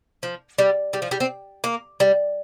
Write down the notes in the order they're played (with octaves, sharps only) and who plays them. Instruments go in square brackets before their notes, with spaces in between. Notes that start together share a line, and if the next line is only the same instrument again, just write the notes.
[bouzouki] F3
G3
G3
F3
G3
C4
A#3
G3